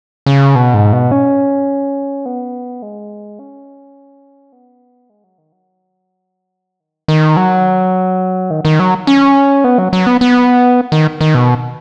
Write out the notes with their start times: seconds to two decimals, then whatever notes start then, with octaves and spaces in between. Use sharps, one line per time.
0.26 C#3
0.55 B2
0.74 G#2
0.93 B2
1.11 C#4
2.26 B3
2.82 G#3
3.39 C#4
4.52 B3
5.10 G#3
5.24 F#3
5.38 D#3
5.52 F#3
6.80 D#3
7.08 D#3
7.37 F#3
8.51 D#3
8.65 D#3
8.79 F#3
9.07 C#4
9.64 B3
9.78 F#3
9.93 F#3
10.07 B3
10.21 B3
10.92 D#3
11.21 D#3
11.35 B2